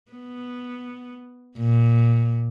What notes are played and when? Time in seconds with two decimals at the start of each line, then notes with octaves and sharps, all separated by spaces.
0.12 B3
1.57 A#2